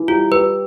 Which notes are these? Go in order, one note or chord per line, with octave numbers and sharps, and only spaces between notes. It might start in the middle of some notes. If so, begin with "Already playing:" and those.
Already playing: E3
G3 F4
G3 B4